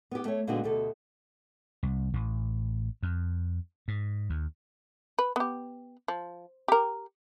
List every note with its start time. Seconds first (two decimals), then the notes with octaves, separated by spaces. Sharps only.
0.11 B3 G4
0.25 A3 C#5
0.47 A#2 D3 G#3 B3 D4 F#4
0.64 D2 B2 G4 A4
1.83 C2
2.13 A1
3.03 F2
3.88 G#2
4.30 D#2
5.19 B4
5.36 B3 G4
6.08 F3
6.68 G4 A#4